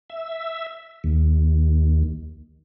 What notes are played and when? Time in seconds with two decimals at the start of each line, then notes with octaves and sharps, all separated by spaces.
0.10 E5
1.04 D#2